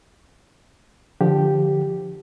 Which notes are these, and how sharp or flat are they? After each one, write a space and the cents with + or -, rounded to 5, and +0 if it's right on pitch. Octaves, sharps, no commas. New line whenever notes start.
D3 +0 F3 +0 G4 +0